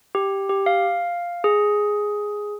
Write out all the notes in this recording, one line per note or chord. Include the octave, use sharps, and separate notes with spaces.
G4
G4
F5
G#4